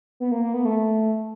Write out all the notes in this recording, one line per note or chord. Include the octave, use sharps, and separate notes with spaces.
B3
A#3
A#3
B3
A3